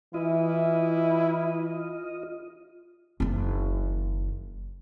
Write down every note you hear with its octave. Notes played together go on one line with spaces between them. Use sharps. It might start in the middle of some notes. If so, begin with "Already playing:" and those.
E3 E4 F4 D#5
F#1 D#3